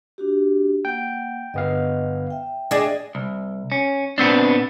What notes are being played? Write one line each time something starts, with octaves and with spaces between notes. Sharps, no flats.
D4 F#4 G4
A#3 F#5 G5
G1 B3 D#5 F5
E5 G5
D4 G#4 D#5
C2
C#4
A#2 B3 C4 D4